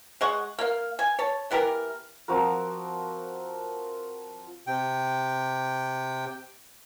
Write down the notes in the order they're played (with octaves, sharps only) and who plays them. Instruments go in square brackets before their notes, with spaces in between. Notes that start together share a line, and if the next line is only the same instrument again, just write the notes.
[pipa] G#3 D#5 F#5 C#6
A#3 F5
G#5
C#5 A5
E3 B3 G4 A#4
[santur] F3 C4 F#4 A#4
[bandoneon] C3 G5